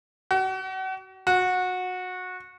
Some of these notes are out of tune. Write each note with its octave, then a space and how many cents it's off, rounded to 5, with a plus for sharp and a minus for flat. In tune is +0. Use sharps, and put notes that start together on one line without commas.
F#4 +35
F#4 -20